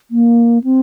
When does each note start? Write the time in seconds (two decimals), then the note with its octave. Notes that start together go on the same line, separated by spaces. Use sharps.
0.10 A#3
0.63 C4